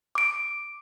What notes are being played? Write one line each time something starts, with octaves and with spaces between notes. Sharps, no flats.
D6 D7